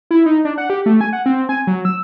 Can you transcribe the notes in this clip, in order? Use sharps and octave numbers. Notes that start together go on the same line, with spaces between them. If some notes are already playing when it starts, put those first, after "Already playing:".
E4
D#4
D4
F#5
G4
A3
G#5
F#5
C4
G#5
F#3
E6